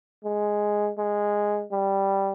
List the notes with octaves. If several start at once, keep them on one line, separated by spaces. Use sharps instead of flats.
G#3
G#3
G3